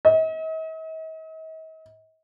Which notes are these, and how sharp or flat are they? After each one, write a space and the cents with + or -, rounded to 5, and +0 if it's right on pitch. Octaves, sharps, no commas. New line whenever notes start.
D#5 +45